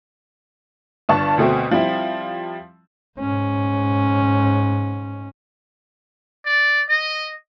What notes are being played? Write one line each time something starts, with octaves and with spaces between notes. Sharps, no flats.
G1 G2 D4 A5 C#6
D2 B2 A3 C4
F3 G3 C4 E4
G#2 C#4
D5
D#5